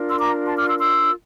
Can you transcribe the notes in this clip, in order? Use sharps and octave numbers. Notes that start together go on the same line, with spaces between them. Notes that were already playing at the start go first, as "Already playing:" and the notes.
Already playing: D4 F4 A#4
C6 E6
A#5 D6
A5 C6
D6 F6
C6 E6
C6 E6